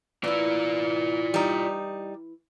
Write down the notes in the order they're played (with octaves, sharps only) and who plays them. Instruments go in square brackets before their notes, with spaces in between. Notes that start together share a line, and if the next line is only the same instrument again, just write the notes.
[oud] E3 E4 [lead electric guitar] F4 D5
[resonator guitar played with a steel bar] G3 D#4